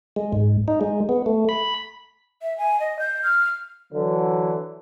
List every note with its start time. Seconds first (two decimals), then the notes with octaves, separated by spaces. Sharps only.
0.16 G#3
0.33 G#2
0.68 D#4
0.81 G#3
1.09 B3
1.26 A3
1.49 B5
2.42 E5
2.58 G#5
2.80 D#5
2.99 G6
3.23 F6
3.93 D3 E3 F#3